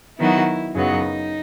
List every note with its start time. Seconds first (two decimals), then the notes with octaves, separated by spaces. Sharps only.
0.19 D#3 F#3 B3 D#4 E4 F#4
0.74 F#2 C#3 F#3 B3 D#4